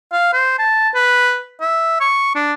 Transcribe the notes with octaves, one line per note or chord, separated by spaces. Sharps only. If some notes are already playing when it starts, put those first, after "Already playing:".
F5
C5
A5
B4
E5
C#6
D4